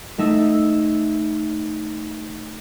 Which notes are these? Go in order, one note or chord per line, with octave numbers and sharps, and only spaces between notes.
A3 D#4 E5